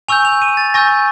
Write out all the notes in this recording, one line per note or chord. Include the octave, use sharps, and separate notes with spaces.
G#5 C#6 E6 G6 F7
F7
D#7
A6
G#5 C#6 E6 G6 A#6